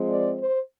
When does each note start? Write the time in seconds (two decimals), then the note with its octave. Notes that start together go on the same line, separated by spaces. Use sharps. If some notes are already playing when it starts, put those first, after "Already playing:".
Already playing: F3 G#3 C4
0.09 D5
0.40 C5